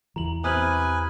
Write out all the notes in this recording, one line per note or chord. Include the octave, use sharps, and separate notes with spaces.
E2 E3 A#5 F#7
C3 B4 G#5 D#6 F6 F#7